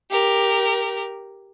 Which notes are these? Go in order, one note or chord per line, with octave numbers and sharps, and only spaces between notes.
G4 A#4